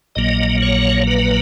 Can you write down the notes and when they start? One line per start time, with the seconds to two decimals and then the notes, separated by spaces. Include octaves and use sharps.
0.15 A#1 A#2 F#3 A#3 D#5
0.62 C#5
1.07 B4